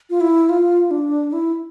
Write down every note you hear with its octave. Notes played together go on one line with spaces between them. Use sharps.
F4
E4
F4
D4
E4